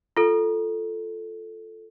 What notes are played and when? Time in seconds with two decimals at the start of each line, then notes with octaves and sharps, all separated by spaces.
0.17 F4 A4